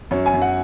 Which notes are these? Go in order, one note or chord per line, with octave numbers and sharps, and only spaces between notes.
F#2 C#5
G#5
F#2
F#5